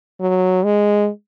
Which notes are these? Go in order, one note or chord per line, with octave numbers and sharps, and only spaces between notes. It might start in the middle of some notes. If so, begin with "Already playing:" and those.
F#3
G#3